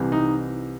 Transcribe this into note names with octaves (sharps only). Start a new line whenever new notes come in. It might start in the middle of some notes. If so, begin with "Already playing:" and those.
Already playing: C2 C3 E3
D#4